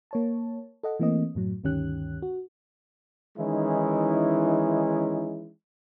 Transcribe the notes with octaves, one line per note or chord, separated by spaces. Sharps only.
A#3 C#5 A5
A4 D#5 F#5
E3 A3 A#3 C4 D#5
F#2 A2 F#3
D2 G2 D#3 C#4 G4 F#6
F#4
D#3 E3 G#3 C#4 D#4 E4